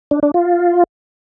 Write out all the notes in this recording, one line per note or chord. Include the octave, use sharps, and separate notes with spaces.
D4
D4
F4